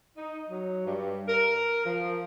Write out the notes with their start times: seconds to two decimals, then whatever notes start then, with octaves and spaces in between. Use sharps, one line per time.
0.16 D#4
0.50 F#3
0.86 G2
1.28 A#4
1.85 F3